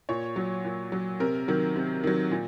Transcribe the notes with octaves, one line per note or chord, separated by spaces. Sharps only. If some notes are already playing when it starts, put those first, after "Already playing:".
A#2 C#5
F#3
A#2
F#3
C3 A#4
D#3 F#3
C3
D#3 F#3
A#2